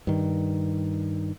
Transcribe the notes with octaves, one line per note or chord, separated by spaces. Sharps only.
G2 D#3